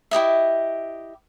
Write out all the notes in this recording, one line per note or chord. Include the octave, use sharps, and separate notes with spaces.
E4 G4 D#5 E5